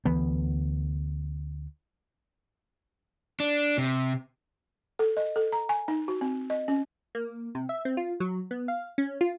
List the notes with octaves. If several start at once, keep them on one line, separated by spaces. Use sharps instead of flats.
D2 E3 B3
D4
C3
A4
D#5
A4
A#5
G#5
D#4
F#4
C4
D#5
C#4
A#3
C3
E5
C4
F4
F#3
B3
F5
C#4
F4